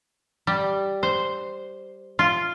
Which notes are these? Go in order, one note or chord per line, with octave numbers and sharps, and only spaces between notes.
G3
C5
F4